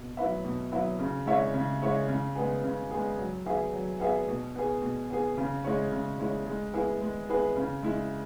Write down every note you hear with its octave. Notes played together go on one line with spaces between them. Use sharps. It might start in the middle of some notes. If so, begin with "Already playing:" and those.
Already playing: B2
F#3 E4 B4 E5
B2
F#3 E4 B4 E5
C#3
G#3 E4 C#5 E5
C#3
G#3 E4 C#5 E5
C#3
G#3 B3 G#4
C#3
G#3 B3 G#4
F#3
B3 G#4 E5
F#3
B3 G#4 E5
B2
B3 G#4
B2
B3 G#4
C#3
G#3 E4 C#5
C#3
G#3 E4 C#5
G#3
B3 E4 G#4 B4
G#3
B3 E4 G#4 B4
C#3
G#3 E4